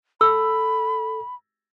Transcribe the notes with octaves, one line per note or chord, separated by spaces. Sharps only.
A4 B5 E6